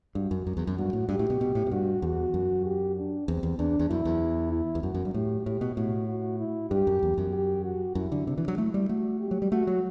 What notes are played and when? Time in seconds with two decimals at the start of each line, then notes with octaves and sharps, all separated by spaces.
0.15 G2 F#4
0.31 F#2
0.47 F#2
0.57 E2
0.67 F#2
0.77 G2 F#4
0.93 A2
1.09 G2 G4
1.19 A2
1.30 B2
1.41 B2
1.55 A2
1.66 A2
1.71 G2 F#4
2.02 E2 F#4
2.34 F#2
2.66 G4
2.97 D4
3.28 E2 C4
3.43 E2
3.58 E2 D4
3.79 E2
3.89 F#2 E4
4.05 E2
4.52 E4
4.75 E2
4.83 F#2 F#4
4.94 F#2
5.05 G2
5.14 A2 G4
5.46 A2 G4
5.61 B2
5.77 A2 F#4
6.08 F#4
6.39 E4
6.71 G2 G4
6.87 F#2
7.03 E2
7.18 F#2
7.33 G4
7.64 F#4
7.95 F#2 E4
8.12 D3
8.27 C3 D4
8.38 E3
8.48 F#3
8.58 A3 E4
8.74 G3
8.89 A3 F#4
9.20 G4
9.31 F#3
9.42 G3
9.52 A3 F#4
9.67 F#3